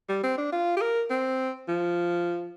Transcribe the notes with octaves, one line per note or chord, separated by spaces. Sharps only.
G3
C4
D4
F4
G4
A#4
C4
F3